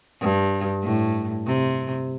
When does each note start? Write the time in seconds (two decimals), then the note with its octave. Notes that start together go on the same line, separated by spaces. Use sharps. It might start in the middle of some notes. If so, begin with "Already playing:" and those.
0.21 G2
0.83 A2
1.46 C3